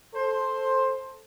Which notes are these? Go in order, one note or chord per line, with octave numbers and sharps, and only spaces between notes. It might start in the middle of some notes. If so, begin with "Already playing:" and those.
A4 C5